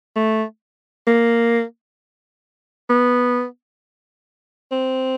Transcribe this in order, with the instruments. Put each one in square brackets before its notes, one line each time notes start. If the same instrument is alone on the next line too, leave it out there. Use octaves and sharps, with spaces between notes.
[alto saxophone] A3
A#3
B3
C4